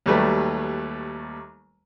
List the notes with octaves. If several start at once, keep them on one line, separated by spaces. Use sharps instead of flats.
D#2 F#3 G3 A3 B4